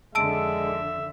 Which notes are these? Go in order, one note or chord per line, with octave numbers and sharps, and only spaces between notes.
F2 D3 D#3 G#3 E5 A5 E6 D7